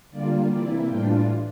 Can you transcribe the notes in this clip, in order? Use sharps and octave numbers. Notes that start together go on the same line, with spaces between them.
D3 G3 A#3 F4 D5
C3 E3 A#3 E4 D5
A2 E3 G3 D4 F4 G5